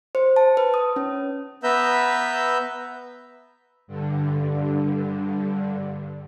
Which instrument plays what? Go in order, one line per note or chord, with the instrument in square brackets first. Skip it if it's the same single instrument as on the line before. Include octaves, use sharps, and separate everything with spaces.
[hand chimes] C5
A5
B4
D#6
C#4
[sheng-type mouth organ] B3 B4 E5 A#5 E6 G6
[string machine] G2 D3